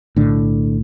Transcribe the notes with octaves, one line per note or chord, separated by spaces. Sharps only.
B1 A2 D3